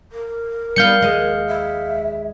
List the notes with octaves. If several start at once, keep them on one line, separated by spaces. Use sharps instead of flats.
A#4
G3 B3 D#4 F5 G6 C#7
D#2 G#3 D#5
E5